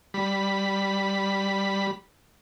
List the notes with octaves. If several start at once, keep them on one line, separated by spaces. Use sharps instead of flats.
G3 B5